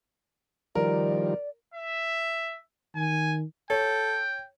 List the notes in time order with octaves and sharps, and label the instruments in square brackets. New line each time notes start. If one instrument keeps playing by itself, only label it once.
[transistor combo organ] D#3 F3 G3 [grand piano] A#4 [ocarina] D5
[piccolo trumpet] E5
[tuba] D#3 [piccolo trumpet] G#5
[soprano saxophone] A4 [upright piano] C#5 [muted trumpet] G5